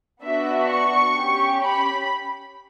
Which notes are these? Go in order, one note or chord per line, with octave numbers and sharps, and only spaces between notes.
B3 D4 F#4 E5
C#6
C#4 G4
B5